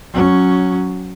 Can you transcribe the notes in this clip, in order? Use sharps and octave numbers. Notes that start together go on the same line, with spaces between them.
F#3 C#4